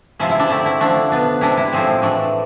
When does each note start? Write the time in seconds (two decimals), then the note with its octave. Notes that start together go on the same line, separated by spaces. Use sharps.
0.19 C3 F3 G#3 E4
0.30 E4
0.40 D4
0.49 D3 A3 C4 E4
0.66 E4
0.80 D3 F3 A3 D4
1.12 B2 B3 D4
1.41 C3 G#3 D4 E4
1.57 E4
1.73 A2 F3 G#3 C4
2.02 E3 A3 D4